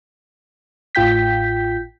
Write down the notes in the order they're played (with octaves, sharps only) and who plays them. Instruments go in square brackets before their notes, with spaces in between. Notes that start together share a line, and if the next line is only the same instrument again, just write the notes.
[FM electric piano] A1 A2 F4 G5 G6 B6